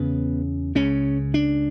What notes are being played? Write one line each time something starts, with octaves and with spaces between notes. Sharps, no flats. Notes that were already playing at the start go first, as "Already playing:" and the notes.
Already playing: E2 C#3 B3
C#2 C#3 C#4
D4